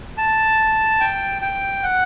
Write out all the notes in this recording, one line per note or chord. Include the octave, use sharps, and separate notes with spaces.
A5
G5
G5
F#5